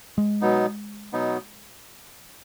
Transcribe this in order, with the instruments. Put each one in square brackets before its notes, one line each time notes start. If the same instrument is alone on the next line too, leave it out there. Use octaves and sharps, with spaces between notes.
[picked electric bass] G#3
[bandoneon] B2 F#3 B3 D#4
B2 F#3 B3 D#4